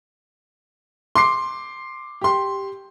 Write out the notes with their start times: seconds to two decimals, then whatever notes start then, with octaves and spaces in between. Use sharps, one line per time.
1.15 C6 D6 C7
2.21 G4 C6